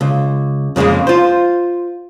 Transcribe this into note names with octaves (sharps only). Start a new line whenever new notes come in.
C#2
F2 C#3 G3 G#3 A#3
F4 C5